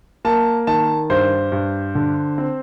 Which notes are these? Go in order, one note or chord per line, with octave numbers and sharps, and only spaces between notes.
A#3 A5
D#3 A5
G2 C5
G2
D3
C4